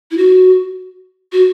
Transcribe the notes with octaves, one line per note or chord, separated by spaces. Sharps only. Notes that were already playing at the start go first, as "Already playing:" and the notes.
E4
F#4
F#4